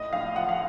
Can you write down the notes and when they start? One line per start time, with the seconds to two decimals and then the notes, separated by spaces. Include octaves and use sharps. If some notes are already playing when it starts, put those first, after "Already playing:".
Already playing: A2 D#5
0.13 A#1 F5
0.36 F3 F#5
0.49 F5